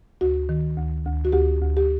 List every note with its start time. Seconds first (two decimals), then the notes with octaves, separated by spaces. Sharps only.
0.21 D2 F#4
0.49 D#3
0.77 D2
1.05 D2
1.25 F#4
1.32 D2 G4
1.61 D2
1.77 G4